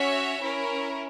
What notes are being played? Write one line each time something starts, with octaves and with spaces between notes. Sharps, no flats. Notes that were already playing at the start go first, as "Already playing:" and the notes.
Already playing: C#4 F#4 C#5 E5
C#4 E4 A#4